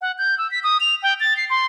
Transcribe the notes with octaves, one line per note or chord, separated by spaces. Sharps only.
F#5
G6
E6
B6
D#6
F7
G5
A6
C7
C6